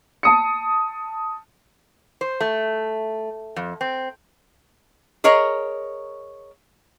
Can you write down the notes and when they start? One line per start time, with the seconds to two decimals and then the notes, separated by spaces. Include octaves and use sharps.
0.23 A5 D#6 C#7
2.21 C5
2.41 A3
3.56 F2
3.81 C4
5.24 G#4 A#4 C#5 D#5 A#5